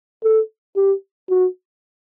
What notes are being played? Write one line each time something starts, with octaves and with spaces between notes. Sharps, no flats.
A4
G4
F#4